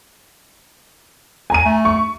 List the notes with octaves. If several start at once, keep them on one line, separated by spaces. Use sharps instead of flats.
G#5 A#5 D#7
A3
C#6